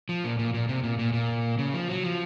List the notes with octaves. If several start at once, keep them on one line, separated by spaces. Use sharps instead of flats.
F3
A#2
A#2
A#2
C3
A#2
A#2
A#2
C#3
F3
F#3
F3